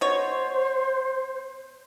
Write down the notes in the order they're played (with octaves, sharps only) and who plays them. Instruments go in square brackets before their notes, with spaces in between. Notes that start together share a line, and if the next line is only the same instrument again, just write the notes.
[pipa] B2 C#5 [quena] C5